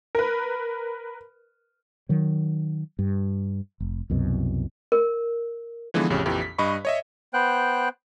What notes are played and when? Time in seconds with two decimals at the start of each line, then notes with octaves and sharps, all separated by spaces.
0.15 A#4 B4
2.09 D#3 F#3
2.99 G2
3.80 F1
4.10 C2 F#2 B2
4.92 A#4
5.94 D3 E3 F3 G#3 B3
6.10 A1 F2 C#3 G4
6.26 A#1 F2 E3 G4
6.42 B6
6.58 G2 D#5 B5 C#6
6.85 C#5 D#5 E5
7.34 B3 C5 G5 F#6